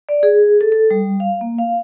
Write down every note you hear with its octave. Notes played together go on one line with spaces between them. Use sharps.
D5
G#4
A4
A4
G3
F5
A#3
F5